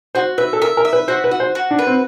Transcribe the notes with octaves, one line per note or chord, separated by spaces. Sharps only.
F#4 C5
B4 E5
A4
A#4 E5
A#4
E5
B4
F#4 C5
B4
F#4
C5
F#4
D4
B4
C4